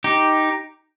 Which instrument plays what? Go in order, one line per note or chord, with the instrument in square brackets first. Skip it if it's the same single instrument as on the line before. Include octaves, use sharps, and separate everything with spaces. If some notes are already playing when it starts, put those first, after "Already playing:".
[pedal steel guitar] D#4 G4